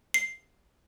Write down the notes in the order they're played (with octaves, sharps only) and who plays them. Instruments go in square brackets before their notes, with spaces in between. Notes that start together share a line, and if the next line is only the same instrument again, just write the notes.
[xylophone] C7